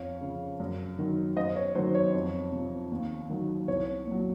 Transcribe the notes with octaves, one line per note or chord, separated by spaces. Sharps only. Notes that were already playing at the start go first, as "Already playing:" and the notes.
Already playing: F2 C#5 F5
C#3 F3
F#2
D#3 F#3
F#2 C5 D#5
C#5
D#3 F#3 C5
C#5
F2
C3 F3
D#2
D#3 F#3
C2 C#5
A#2 F#3